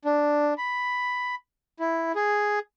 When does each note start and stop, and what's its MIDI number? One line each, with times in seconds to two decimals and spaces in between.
0.05 0.54 62
0.58 1.35 83
1.79 2.12 64
2.15 2.59 68